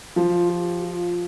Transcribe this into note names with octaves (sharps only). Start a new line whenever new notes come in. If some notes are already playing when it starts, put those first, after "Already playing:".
F3 F4
G4
F4